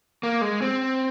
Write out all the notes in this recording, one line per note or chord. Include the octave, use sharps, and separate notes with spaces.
A#3
G#3
C4